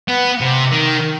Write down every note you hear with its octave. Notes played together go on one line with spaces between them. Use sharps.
B3
C3
D#3